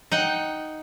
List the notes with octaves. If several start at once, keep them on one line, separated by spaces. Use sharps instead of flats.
D#4 F#5 G5